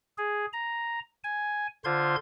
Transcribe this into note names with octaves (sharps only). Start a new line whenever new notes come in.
G#4
A#5
G#5
D3 F4 C5 C6 G#6